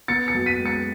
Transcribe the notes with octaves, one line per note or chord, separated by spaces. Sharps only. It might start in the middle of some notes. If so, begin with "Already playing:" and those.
B3 A6 C#7
A6 C#7
F#2
B6 D#7
G#3
A6 C#7